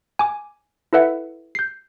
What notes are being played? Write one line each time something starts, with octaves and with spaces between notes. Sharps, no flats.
G#5 D6
E4 A4 B4 E5 F#5
G6 C7